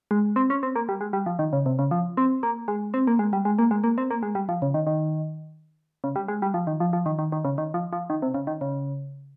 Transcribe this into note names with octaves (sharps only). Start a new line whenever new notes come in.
G#3
C4
C#4
C4
A#3
G3
G#3
G3
F3
D#3
C#3
C3
C#3
F3
C4
A#3
G#3
C4
A#3
G#3
G3
G#3
A#3
G#3
A#3
C4
A#3
G#3
G3
F3
C#3
D#3
D#3
C#3
G3
G#3
G3
F3
D#3
F3
F3
D#3
D#3
D#3
C#3
D#3
F3
F3
D#3
C3
C#3
D#3
C#3